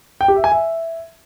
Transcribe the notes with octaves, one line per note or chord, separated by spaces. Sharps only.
G5
G4
E5
G#5
E5